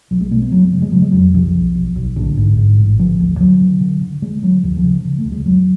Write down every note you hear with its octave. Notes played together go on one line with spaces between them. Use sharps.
B1 F#3
G#3
B2 A3
B3
F#1 F#3
G#3
C#3 F#3
G#3
C#3 F#3
G#3
F2 F#3
B1 F3
B1
B1
B1
A1 D3
G#2
G#2
A1
D3 F3
D2
D3 F#3
D3
D3
D3
D3 G#3
D3 F#3
D2 F3
F3
C#3
F3
C#3
A3
D2
G#3
F#1 F#3